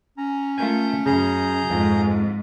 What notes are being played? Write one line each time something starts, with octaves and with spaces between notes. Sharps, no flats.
C#4 A#5
A3 F4 A#4 G#5 G6
F#2 C#3 G#4 A#5 G6
F2 G#2